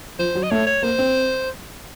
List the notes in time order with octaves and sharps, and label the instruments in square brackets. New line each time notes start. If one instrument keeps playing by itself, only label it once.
[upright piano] F3 [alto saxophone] C5
[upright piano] F#3
[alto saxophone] D#5
[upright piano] A3 [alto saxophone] C#5
[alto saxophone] C#5
[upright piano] A#3 [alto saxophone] C5
[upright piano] C4